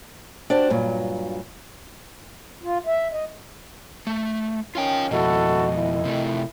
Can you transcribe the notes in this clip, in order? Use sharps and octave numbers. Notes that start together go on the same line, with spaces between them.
D4 F#4 G4 C5 D5
G2 A#2 F#3
F4
E5
D#5
A3
D#3 C#4 F4 F5 G5
F2 B2 E4 F#4 A4 D#5
D#3 E4
C3 A3